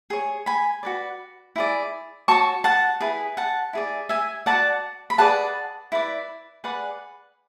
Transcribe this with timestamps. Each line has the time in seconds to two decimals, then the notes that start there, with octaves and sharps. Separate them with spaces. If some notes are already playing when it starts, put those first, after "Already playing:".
0.10 G#4 C#5
0.46 G#5 B5
0.83 F#4 B4 D5
1.56 E4 G#4 D5
2.28 F#4 C#5 A5 C#6
2.64 F#5 A5
3.00 E4 G#4 B4
3.37 F#5 A5
3.73 E4 G#4 D5
4.09 E5 G#5
4.46 B4 D5 F#5 A5
4.51 F#4
5.10 B5
5.18 G#4 B4 D5 F#5 A5
5.92 E4 B4 D5
6.64 G#4 B4 D5 F#5